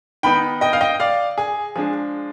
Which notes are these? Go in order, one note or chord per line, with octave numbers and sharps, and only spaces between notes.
D#3 B3 D#4 G5 B5
D#5 G5
F5
D#5 G5
D5 F5
G#4
F3 G#3 D4 G#4